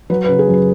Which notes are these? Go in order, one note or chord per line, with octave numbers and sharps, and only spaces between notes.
F#3 B4
B4
C#3
G#4
F#2
B4